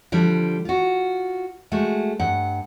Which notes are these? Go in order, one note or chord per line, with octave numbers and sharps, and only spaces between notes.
D3 F3 G3
F4 F#4
G#3 A3 F#4
G2 F#5